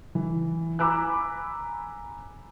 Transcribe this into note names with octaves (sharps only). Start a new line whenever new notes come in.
E3
G#5 A#5 B5 D6 E6 F#6